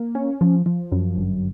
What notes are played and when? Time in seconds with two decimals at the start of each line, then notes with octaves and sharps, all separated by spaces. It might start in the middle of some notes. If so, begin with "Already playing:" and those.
Already playing: A#3
0.15 C#4
0.41 F3
0.66 F3
0.92 F#2
1.17 G1